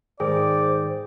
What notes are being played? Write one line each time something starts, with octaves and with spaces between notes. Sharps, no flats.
G#2 D#3 G#4 C5 D5 G5